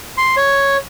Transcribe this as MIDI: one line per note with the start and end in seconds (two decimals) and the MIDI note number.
0.17 0.35 84
0.37 0.77 73